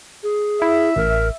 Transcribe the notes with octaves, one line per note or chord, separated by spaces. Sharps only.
G#4
E4 E5
A1 A#4